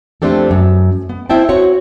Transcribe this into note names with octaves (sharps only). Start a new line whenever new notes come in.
F2 A3 C4 D4 G4 A4
F#2
B3
C4 E4 E5 G5 A5
C4 F#4 C#5